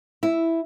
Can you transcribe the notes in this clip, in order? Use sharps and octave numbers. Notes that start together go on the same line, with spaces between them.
E4